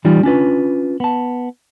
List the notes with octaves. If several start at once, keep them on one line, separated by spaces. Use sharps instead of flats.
E3 G3 D#4 F4
C#4 D4 F4 B4
B3 A5